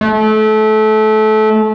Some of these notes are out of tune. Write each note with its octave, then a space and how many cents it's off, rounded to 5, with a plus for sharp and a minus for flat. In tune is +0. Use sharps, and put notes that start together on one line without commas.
A3 -25